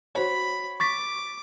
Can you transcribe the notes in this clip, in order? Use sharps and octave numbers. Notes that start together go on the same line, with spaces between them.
F#4 C5 C#5 B5
C#6 D6 A6 B6